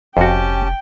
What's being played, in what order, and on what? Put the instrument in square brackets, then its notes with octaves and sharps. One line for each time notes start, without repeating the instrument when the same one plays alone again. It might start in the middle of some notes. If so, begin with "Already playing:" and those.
[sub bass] F1 [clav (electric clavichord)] F2 F#4 [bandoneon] C#4 G4 A5 [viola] G5